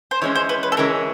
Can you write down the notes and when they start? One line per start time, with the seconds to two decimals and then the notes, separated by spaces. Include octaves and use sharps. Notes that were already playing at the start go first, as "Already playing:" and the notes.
0.11 C5
0.22 E3 G#3 C#4 C#5
0.35 C5
0.49 B4
0.63 B4
0.72 A4
0.77 E3 G#3 C#4 A#4